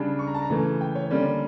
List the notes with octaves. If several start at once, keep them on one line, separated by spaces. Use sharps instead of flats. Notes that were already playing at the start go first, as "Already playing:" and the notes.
Already playing: C#3 G3 D4
C#6
A#5
A5
A#5
C#3 E3 A3
G5
C#5
D3 G3 A#3 C#4 D5